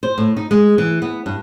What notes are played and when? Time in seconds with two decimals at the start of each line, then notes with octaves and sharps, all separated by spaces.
0.03 C5
0.18 A2
0.37 D#4
0.51 G#3
0.78 E3
1.02 B3
1.26 G2